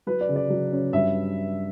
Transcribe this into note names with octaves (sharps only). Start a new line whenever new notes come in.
F#3 B4
D5
C#3
D5
F#3
C#4
G2 E5